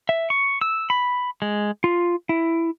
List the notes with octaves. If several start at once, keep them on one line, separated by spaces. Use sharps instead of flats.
E5
C#6
E6
B5
G#3
F4
E4